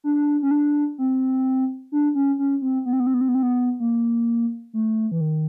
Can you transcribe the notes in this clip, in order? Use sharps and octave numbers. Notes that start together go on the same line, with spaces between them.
D4
C#4
D4
C4
D4
C#4
C#4
C4
B3
C4
B3
C4
B3
C4
B3
C4
B3
A#3
A3
E3
D#3